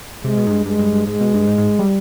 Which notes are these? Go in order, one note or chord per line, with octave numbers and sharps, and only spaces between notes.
C3 G#3
B2
G#2
G2
G2 G#3
G2
G2
G#2 G#3
B2
G2
G#2
G#2
G3